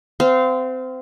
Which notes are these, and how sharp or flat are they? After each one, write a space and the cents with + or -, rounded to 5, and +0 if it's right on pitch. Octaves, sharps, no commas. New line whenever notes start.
C4 -25 F5 -5